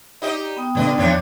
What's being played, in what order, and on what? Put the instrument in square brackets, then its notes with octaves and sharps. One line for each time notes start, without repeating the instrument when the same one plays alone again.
[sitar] D#4 G4 D#5
[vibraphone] B3 G5 D#6
[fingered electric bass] A1 C#3 A3 [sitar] G2 D4 D#5
[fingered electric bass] E2 D#3 F3 [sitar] A2 D4 C#5